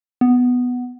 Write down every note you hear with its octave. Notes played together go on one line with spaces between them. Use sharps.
B3